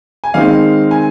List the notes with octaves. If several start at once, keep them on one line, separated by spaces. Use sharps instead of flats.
G#5
D#3 G#3 C4 D#4 F5
G#5